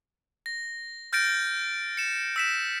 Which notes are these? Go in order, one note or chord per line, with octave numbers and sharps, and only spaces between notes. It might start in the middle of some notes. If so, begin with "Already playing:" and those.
A#6
F6 G6 A6 A#6 D7
C#7 E7
E6 B6 E7